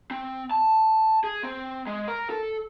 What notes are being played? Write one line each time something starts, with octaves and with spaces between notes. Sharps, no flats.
C4
A5
G#4
C4
G#3
A#4
A4